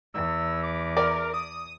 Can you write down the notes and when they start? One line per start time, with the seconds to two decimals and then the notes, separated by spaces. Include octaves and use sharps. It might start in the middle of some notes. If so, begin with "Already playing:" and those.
0.14 E2 E6
0.63 D6
0.97 A#4 D5
1.34 D#6